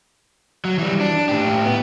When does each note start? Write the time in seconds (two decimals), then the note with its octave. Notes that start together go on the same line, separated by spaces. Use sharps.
0.65 F#3
0.79 E3 G3
1.01 D4
1.29 A2 G4
1.65 B3